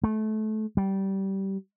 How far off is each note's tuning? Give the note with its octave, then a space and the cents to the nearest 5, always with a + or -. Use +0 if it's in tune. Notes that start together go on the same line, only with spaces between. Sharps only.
A3 -25
G3 -20